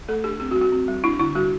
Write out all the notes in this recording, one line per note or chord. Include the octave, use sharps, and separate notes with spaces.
A3 A4
D4 G4
C4 G4
F#4
G3
F#4
C4
G3
D4 E4
D3 E4
G3 F#4